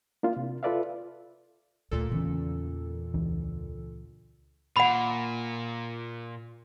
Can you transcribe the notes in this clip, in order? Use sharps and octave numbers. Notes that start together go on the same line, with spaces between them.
A#3 D4 E4 F4
C3
F4 A4 B4 D5 E5 F5
D2 A#2 A4
E2 C#3 E3 C#4
C#2 E3 D4
A#2 F#5 B5